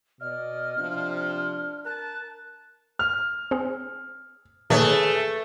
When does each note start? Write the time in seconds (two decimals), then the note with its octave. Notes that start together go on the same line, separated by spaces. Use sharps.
0.21 B2 D5 D#5 F6
0.78 C3 F3 D4
1.85 A#4 A5 F#6
2.99 F6
3.51 C4 G#4
4.70 A#2 D#3 A3 G#4 B4 C#5